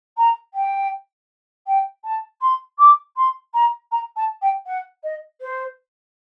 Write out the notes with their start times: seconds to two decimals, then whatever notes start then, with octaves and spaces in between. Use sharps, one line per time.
0.17 A#5
0.54 G5
1.67 G5
2.04 A5
2.41 C6
2.78 D6
3.16 C6
3.54 A#5
3.91 A#5
4.16 A5
4.42 G5
4.66 F#5
5.03 D#5
5.41 C5